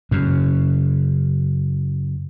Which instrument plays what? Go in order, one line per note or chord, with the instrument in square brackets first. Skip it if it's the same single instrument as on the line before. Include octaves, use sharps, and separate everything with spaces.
[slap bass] F#2 C#3